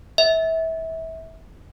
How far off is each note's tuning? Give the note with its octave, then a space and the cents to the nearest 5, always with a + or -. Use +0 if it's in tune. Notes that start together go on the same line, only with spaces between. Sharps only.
E5 -25